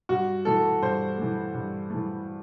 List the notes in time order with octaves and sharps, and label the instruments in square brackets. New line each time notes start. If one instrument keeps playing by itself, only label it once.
[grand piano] G2 F#4
E3 A3 A4
G2 C5
E3 A3
G2
E3 A3